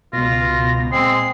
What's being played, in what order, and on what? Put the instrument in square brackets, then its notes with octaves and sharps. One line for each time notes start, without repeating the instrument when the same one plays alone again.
[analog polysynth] C#2 B2 [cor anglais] F4 [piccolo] A#6
[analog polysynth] A#2 [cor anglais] G#3 [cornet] C4 [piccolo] C7